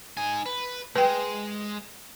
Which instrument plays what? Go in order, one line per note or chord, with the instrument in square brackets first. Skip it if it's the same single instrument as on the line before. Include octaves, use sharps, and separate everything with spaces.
[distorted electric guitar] D#4 G#5
B4
[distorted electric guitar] G#3 [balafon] B4 G5